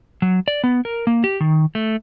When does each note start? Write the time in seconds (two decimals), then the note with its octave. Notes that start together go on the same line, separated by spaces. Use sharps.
0.22 F#3
0.48 D5
0.64 B3
0.85 A#4
1.07 A#3
1.24 G4
1.40 D#3
1.75 A3